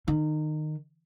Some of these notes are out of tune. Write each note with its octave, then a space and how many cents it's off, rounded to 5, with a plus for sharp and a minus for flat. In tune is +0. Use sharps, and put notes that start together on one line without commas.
D#3 -25